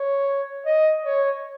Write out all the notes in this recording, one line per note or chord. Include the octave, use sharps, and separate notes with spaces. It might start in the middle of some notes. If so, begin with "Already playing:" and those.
Already playing: C#5
D#5
C#5